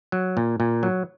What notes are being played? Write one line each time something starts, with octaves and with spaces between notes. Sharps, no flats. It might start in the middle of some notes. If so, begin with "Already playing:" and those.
F#3
A#2
A#2
F#3